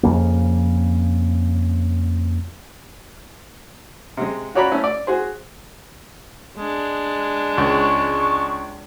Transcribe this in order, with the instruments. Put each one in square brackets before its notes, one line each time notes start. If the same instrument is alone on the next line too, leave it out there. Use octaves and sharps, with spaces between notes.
[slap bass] F2 C#3 A#3
[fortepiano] C3 G#3
F4 F#4 C#5 D5 A#5 B5
A3 C#4 E4
D5
F#4 G#4 C5
[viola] G#3 D4
[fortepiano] C#2 [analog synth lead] C#6